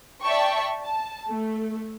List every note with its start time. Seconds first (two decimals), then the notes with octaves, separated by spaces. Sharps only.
0.24 D5 E5 G5 A5 C#6
0.85 A5
1.29 A3